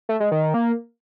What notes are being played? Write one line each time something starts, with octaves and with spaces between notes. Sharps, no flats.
A3
G#3
D#3
D#3
A#3